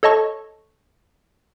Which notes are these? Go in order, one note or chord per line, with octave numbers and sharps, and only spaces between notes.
A4 C#5 D#5 A5 C#6